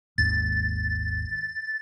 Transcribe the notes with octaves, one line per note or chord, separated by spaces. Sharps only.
G#1 D#2 A6